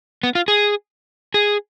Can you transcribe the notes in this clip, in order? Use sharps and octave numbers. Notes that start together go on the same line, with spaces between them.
B3
F4
G#4
G#4